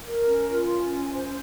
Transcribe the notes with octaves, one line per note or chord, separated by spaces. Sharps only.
A#4
C#4
F4
C#4
G#5
C5